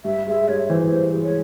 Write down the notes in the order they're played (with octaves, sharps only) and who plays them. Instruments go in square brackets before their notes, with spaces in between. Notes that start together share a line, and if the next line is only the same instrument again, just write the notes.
[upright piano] G2 [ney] E5
[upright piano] G#3 [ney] E5
[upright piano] G2 [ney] C#5
[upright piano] E3 [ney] C5
[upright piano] G2
G#3
[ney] C#5